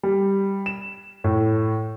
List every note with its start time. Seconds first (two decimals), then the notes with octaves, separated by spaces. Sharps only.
0.03 G3
0.66 E7
1.24 A2